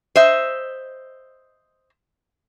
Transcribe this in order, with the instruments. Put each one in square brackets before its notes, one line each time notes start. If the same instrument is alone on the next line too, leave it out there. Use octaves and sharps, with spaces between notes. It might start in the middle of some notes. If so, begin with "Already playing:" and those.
[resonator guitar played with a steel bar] C5 D#5 E5